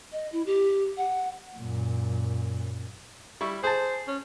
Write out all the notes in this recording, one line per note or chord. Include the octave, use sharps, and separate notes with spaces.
D#5
E4
G4
F#5
F#2 A#2
G3 E4 C#6
G#4 C5 A5
C#4